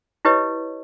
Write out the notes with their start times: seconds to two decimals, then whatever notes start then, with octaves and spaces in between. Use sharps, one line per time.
0.25 E4 G4 B4 C#5 D#5